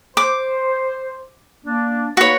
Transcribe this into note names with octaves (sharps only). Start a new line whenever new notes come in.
C5 D6
A#3 D4
A#3 D#4 F#4 B4 C#5